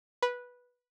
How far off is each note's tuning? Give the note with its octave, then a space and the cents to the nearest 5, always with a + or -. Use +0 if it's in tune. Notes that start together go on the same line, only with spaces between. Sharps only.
B4 -10